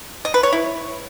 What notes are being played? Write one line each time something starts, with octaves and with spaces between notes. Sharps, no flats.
D#5
B4
C#5
E4